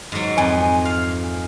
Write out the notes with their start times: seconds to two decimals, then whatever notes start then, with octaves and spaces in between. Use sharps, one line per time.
0.12 G#2 F#3
0.38 F2 G#5
0.85 F5